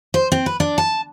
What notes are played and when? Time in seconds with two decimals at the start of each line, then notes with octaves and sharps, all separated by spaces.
0.14 C5
0.32 C4
0.46 B4
0.60 D4
0.78 A5